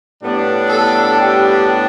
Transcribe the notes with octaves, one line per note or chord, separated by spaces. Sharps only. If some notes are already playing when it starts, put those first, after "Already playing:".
A2 G3 B3 D4
A4
G4